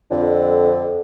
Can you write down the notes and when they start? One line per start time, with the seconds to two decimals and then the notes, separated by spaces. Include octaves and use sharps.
0.11 F2 D3